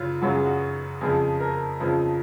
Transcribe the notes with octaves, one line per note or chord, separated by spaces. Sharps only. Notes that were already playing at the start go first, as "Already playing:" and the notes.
Already playing: F#2 C#3 F4
F#2 C#3 F#3 F#4
G#4
F#4
F2 C#3 F3 G#4
A#4
F2 C#3 F3